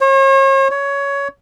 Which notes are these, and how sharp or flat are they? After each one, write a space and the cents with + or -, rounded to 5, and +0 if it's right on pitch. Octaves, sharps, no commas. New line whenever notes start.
C#5 -40
C#5 +15